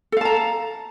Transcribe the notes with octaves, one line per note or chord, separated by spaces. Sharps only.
A4 F5 A5 A#5